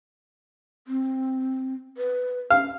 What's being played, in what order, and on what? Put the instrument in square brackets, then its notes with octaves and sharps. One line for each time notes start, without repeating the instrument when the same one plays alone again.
[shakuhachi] C4
B4
[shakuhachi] C#4 [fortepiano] F5